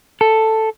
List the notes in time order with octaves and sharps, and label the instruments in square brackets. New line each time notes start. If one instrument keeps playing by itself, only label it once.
[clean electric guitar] A4